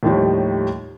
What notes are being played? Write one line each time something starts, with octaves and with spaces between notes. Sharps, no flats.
D#2 A2 D#3 F3 G3